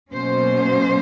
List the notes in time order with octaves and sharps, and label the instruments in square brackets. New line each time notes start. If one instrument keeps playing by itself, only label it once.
[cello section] B2 F#3 A#3 C#4 C5